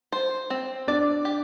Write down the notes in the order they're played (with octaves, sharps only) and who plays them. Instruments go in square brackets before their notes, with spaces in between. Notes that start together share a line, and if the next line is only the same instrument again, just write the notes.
[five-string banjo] C5
C4
[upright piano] D4 [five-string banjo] D5
[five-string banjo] G4